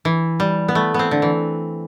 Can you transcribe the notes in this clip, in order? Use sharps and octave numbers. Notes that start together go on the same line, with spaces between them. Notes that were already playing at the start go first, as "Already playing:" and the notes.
E3
G3
B3
A3
B3 C4
D3
E3